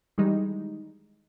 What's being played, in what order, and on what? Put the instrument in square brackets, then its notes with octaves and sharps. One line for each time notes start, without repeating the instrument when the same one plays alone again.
[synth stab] D#3 E3 G3 G#3 D#4